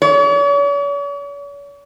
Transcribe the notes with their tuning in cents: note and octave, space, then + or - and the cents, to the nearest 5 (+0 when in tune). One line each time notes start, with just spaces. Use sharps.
C#5 +45